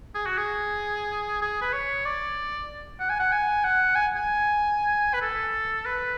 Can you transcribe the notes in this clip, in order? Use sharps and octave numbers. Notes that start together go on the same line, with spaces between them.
G#4
F#4
G#4
G#4
B4
C#5
D5
F#5
G#5
F#5
G#5
F#5
G#5
G#5
B4
A4
B4